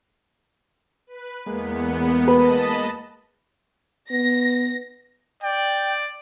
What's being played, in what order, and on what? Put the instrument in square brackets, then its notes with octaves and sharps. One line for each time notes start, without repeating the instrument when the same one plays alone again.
[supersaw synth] B4
[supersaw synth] E2 B3 [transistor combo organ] G#3 A#3
[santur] B4 [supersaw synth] D#5 A5 B5
[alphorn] B3 [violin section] A#6
[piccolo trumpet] D5 [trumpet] G5